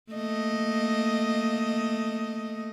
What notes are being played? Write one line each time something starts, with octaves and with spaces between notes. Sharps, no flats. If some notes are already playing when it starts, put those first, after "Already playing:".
A3 A#3 D#5